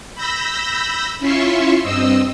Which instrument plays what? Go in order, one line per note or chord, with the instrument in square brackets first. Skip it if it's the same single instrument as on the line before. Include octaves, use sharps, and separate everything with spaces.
[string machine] B5 E6 G6 A#6
C#4 E4 F4 E5 C6 C#6
G2 C4 D#5 E6